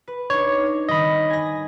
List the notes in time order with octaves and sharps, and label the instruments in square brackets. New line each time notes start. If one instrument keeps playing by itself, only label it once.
[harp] B4
[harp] D4 D#4 [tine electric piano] C#5
[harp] D#3 G3 [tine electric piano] D#5 B5
[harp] G#5 A#6